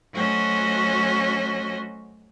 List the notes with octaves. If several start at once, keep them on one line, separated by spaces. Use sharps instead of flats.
F#3 A3 C#4 F#4 C5 D#5